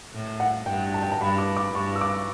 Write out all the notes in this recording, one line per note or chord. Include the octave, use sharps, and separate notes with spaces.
A2
F#5
G2 G5
A5
G5
A5
G2 B5
D6
D6
G2 C#6
E6
D6